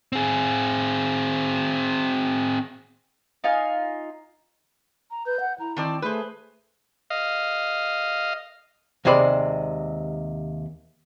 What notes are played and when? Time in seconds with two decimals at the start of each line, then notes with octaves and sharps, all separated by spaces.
0.13 C4 G#4
3.44 D#4 F4 F5 G#5
5.11 A#5
5.26 B4 G6
5.40 F#5
5.59 E4 A#5
5.76 D#3 C4 D5 A5
6.02 A3 G#4 B4 C5
7.10 D#5 F5
9.05 D#2 C3 G#3 C5 D5 B5